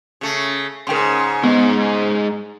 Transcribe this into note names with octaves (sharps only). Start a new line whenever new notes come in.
C#3 A3
G#2 C#3 A#4 G5 C6
G#3 B3 D#4